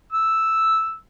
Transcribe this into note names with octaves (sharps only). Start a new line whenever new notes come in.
E6